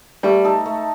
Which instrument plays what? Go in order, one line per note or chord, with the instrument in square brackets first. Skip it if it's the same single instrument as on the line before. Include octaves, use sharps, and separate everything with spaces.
[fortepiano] G3 [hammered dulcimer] A3
[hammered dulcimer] D#4 A4
A3